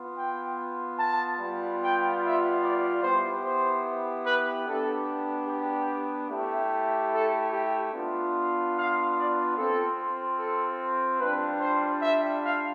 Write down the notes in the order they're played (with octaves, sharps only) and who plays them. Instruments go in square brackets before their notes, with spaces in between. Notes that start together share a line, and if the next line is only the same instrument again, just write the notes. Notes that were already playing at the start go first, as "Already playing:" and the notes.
Already playing: [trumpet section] B3 F4
G5
A5
G3 B3 F4
G5
E5
D5
B3 E4 G4 C5
C5
B4
B3 D4 G4 A4
G4
A3 E4 G4
A4
G4
B3 D4 F4
F5
D5
C4 F4 A4
A4
G3 D4 F4 B4
C5
E5
F5